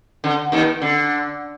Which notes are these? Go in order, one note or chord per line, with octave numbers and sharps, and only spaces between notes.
D3
D#2 D#3
D3